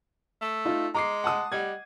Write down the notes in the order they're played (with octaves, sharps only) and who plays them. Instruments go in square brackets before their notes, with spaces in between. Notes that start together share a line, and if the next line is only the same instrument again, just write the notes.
[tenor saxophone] A3
[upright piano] D#4 F4
[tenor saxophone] G#3 [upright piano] A#5 D6 C7
[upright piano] F#5 A5 D#6
[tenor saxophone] G3 [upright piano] D#5 F#5 G#6